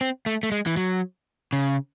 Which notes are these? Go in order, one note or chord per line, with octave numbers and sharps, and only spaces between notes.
C4
A3
A3
G#3
E3
F#3
C#3